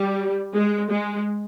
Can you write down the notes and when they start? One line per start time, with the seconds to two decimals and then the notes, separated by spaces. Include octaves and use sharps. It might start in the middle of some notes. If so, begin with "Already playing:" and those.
Already playing: G3
0.54 G#3
0.91 G#3